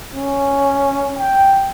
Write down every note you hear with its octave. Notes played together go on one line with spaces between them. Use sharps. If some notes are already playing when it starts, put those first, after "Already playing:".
C#4
G5